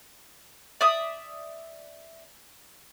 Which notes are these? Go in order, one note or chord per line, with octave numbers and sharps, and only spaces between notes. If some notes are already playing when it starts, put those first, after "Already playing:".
D5 E5 D#6